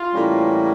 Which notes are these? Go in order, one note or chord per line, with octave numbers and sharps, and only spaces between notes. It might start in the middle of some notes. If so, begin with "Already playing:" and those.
Already playing: F4
A2 E3 G3 A#3 C#4